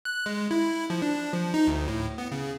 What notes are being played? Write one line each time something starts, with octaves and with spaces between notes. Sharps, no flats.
F#6
G#3
E4
F3
D4
F3
D#4
D2
A2
B3
C#3